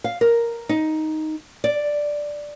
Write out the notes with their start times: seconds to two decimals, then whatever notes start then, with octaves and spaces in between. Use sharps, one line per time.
0.04 F5
0.21 A#4
0.69 D#4
1.64 D5